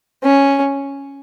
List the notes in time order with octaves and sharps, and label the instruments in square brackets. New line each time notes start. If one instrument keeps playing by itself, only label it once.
[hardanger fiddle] C#4